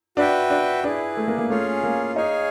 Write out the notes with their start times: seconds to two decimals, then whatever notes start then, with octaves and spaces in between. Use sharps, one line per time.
0.17 D4 F#4 B4 E5 G5
0.50 D4
0.83 D4 E4 G#4 B4
1.17 A3
1.28 A#3
1.38 A#3
1.50 A3 C#4 F4 G#4 C#5 F5
1.83 A#3
2.16 D#4 G#4 C#5 F5 G#5